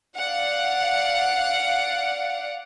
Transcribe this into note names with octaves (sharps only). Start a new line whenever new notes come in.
D5 F5 F#5